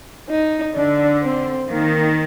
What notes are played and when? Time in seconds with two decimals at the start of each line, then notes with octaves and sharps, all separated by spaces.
0.30 D#4
0.75 D3 D4
1.23 C4
1.69 D#3 A#3